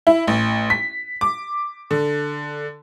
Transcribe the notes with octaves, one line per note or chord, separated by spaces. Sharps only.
E4
A1
B6
D6
D3